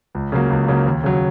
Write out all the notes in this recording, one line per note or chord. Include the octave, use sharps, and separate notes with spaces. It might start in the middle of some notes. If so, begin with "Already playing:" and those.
C#2
C#3 F#3 A#3
C#2
C#3 F#3 A#3
D#2
C#3 F#3